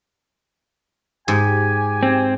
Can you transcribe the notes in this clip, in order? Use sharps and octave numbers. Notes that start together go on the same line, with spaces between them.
G#2 G4 G#5
C4